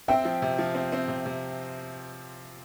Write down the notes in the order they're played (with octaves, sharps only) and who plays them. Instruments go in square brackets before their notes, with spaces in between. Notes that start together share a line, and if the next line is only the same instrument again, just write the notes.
[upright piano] C4 [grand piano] E5 G5
[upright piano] F3
C3
F3
C4
C4
C3
C3